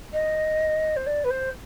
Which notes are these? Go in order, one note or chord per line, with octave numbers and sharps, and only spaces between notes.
D#5
C5
D5
B4
C5